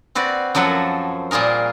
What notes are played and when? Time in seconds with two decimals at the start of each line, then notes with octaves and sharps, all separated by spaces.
0.15 C4 F#4 B4 D5
0.55 F#2 F3 F#3 A4 F#5
1.31 A#2 G3 F4 G#4 A#4